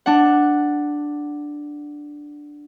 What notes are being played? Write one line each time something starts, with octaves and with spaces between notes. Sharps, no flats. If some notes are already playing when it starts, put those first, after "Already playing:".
D4 F#5